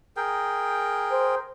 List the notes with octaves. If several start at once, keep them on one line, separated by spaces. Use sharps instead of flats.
G#4 A#4 G5
C5